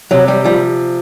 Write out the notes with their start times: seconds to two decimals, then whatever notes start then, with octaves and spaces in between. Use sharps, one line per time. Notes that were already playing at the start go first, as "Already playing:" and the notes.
0.11 C3 F#3
0.28 G3
0.45 F3 G3